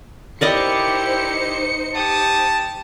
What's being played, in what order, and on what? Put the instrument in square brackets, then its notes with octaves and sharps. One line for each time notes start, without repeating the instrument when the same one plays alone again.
[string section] D#4 C5 C#7 [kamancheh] E4 G4 [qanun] A#4 D5 D#5
[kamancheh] G4 D#6 [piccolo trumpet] A5